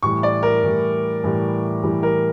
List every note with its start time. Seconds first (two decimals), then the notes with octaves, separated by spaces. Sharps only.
0.03 A2 E3 G3 C#6
0.23 D5
0.43 A#4
0.63 A2 E3 G3
1.23 A2 E3 G3
1.83 A2 E3 G3
2.03 A#4